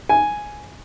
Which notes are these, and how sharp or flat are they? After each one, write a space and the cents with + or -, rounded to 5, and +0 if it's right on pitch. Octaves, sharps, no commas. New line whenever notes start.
G#5 +0